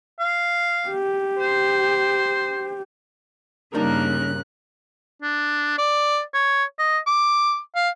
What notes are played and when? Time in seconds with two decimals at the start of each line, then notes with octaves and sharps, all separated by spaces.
0.20 F5
0.88 G4
1.38 C5
3.75 G2 C#3 G3 A#3 D4 D#4 A#4 F#6
5.22 D4
5.78 D5
6.34 C#5
6.79 D#5
7.07 D6
7.75 F5